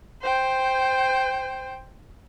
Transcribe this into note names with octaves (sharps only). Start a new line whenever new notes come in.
C5 G5